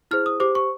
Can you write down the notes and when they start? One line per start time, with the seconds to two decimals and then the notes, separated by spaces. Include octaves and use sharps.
0.11 E4 G#4 C5 F6
0.26 D#6
0.40 G4 C5 D6
0.55 C#6